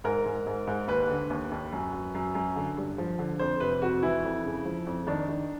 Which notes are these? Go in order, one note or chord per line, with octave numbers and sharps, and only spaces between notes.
G#2 A#4
G#2
G#2
G#2
D#2 B4
D3
D#2
D#2
F#2
F#2
F#2
F#2
D3
G2
F3
D3
F2 C5
C3 B4
F2 F#4
E3 E4
F2
C#3
F3
F2
D#3 D4
D#3